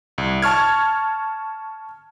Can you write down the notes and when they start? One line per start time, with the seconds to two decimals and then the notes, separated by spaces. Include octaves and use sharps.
0.18 C2
0.42 A5 C#6 F6 G#6